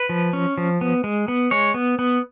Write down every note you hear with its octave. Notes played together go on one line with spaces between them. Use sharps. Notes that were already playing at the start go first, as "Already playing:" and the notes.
Already playing: B4
F3
C#4
F3
B3
G#3
B3
G#3 C#5
B3
B3